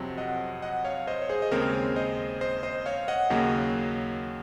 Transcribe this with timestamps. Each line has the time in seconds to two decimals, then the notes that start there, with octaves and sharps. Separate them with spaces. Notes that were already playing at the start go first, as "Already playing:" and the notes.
Already playing: F2 C3 F#3 C4
0.18 D#5 F#5
0.62 D#5 F#5
0.85 C#5 F5
1.07 C5 D#5
1.22 C#5
1.29 G#4 C5
1.42 D#5
1.51 D#2 C#3 G#3 C4 A#4 C#5
1.96 C5 D#5
2.41 C5 D#5
2.63 C5 D#5
2.86 C#5 F5
3.08 D#5 F#5
3.30 D#2 C#3 F#3 A#3